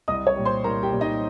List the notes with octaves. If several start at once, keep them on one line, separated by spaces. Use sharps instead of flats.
C2 D#5 D#6
C#5 C#6
A#2 G3
C5 C6
C2 A#4 A#5
G4 G5
A#2 G3
D#4 D#5